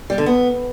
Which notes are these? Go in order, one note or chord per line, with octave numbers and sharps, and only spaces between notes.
G3
D3
B3